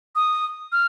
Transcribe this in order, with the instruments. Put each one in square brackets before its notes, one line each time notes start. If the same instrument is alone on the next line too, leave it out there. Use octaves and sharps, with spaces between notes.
[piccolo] D#6
F6